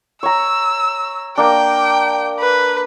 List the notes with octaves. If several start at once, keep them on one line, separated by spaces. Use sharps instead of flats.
C#5 A#5 E6
A#3 D4 G5
B4